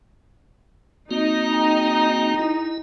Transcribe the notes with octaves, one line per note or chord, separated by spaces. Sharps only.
A#3 C4 D#4 F#4
G#4 G5 A#5
E4